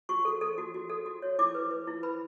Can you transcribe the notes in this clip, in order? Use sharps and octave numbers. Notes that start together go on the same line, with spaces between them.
F#4 C#6
A4
A4
F#4
F#4
A4
F#4
C#5
E4 D6
B4
B4
E4
B4 B5